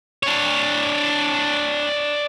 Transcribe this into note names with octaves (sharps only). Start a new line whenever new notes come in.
D4 C#5